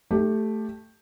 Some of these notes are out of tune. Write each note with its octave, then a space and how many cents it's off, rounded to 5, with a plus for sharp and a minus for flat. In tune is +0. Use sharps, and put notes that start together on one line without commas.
A3 +0 G4 +10